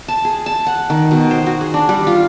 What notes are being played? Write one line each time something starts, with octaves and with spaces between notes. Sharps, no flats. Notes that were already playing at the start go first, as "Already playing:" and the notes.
A5
G#4
A5
F#5
D#3
B2
C5
F#4
G#4
D4
G3
F4